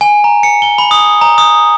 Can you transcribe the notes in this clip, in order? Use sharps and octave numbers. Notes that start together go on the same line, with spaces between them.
G#5
A#5
C#7
G7
B5
D#6
A#5
D#6